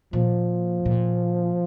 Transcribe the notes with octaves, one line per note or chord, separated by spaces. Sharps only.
A#2 F3
A#2